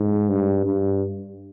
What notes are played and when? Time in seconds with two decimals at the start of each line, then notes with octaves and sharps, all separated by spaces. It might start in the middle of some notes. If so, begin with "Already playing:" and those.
Already playing: G#2
0.29 G2
0.65 G2